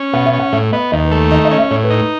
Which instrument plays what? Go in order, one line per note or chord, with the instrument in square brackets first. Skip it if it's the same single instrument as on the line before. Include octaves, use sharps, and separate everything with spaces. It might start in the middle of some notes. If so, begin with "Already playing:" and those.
Already playing: [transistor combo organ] C#4
[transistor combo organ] B2 [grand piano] F#5
[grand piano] E5
[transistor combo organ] C#4
[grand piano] F#5
[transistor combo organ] A2 [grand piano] E5
[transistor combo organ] B3 [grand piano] D#5
[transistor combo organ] D#2 [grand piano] D#5
[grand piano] B4
[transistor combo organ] A3
[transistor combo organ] D#3 [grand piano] D#5
[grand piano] D#5
[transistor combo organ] C#4
[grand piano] E5
[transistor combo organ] A2 [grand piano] C#5
[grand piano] B4
[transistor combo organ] D#4
[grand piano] B4